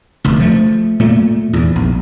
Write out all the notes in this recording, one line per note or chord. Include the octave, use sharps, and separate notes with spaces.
F1 D2
F3 A3
A#2 A3
E2 G#2
A#1